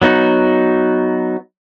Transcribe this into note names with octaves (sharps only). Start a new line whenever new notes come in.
F#3 B3 D#4 F#4